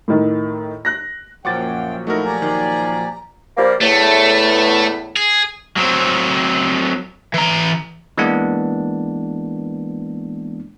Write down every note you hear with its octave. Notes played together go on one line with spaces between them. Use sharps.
A2 D#3
F#6 A#6
F#2 A#2 F3 F#3 F#5 G5 D6 A6
A3 D#4 E4 F#4 A#4 D#5
G4 D5 G#5 A#5
D#3
F3 G3 A#3
E2 A2 A3
G#4
F#3 C4
E3 A#5
E3 G#3 A#3 B3 D4